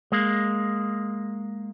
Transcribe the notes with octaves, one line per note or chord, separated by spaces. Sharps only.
G#3 A#3